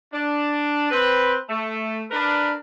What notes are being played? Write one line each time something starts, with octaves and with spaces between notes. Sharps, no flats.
D4
C4 B4
A3
D4 A#4 B4